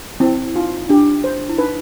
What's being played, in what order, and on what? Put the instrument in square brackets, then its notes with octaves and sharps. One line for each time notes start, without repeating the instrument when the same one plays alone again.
[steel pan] C4 [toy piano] E4
[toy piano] D#4 [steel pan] F4
[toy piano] D4 [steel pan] G4
[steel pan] C5
[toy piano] E4
[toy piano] D#4 [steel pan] B4